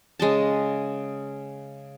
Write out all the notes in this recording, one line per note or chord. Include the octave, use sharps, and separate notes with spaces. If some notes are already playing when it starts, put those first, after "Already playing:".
C#3 G#3 D#5 A5